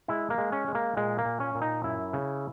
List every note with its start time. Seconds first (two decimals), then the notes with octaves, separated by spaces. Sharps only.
0.08 G#3 E4
0.30 A#3
0.38 G#3
0.52 C#4
0.68 G#3
0.75 A#3
0.97 A#2 G#3
1.18 A#3
1.25 A#2
1.40 C#4
1.55 A#2
1.61 D#4
1.84 F#2 E4
2.13 C#3